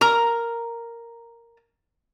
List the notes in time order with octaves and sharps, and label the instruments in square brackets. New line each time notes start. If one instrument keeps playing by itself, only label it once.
[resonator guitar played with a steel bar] A#4 A#5